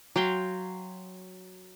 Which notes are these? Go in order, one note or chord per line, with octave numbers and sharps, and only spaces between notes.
F#3 F5 G5 C6